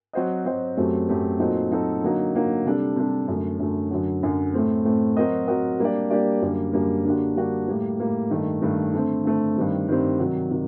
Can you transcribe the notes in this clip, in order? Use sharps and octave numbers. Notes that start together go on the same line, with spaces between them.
F#3 C4 F#4 C5 D#5
F#3 C4 F#4 C5 D#5
F#2 F#3 A3 C4 G4
F#2 F#3 A3 C4 G4
A#2 F#3 C4 D#4 A4
A#2 F#3 C4 D#4 A4
D3 F#3 A#3 D#4
D3 F#3 A#3 D#4
C3 G3 D4 A4
C3 G3 D4 A4
F#2 D3 A3
F#2 D3 A3
F#2 D3 F#3
F#2 D3 F#3
A2 A3 C4
A2 A3 C4
F#3 C4 F#4 A#4 D#5
F#3 C4 F#4 A#4 D#5
G3 A#3 D4 G4 D5
G3 A#3 D4 G4 D5
F#2 D3 G3 A#3
F#2 D3 G3 A#3
D3 G3 A#3 D4 F#4
D3 G3 A#3 D4 F#4
A2 G3 A#3
A2 G3 A#3
G2 D#3 A3
G2 D#3 A3
D3 A3 C4
D3 A3 C4
G2 D#3 G3 C4
G2 D#3 G3 C4
C3 D#3 F#3
C3 D#3 F#3